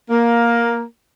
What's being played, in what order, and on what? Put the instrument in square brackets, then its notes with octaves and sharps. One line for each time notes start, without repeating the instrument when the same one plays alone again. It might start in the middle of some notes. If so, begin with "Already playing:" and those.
[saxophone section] A#3